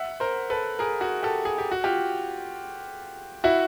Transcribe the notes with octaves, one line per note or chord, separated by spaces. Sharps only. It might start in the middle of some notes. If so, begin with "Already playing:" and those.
Already playing: E5 F#5
A#4 C5
A4 B4
G#4 A#4
F#4 G#4
G4 A4
G#4
G4
F#4
F4 G4
E4 F#4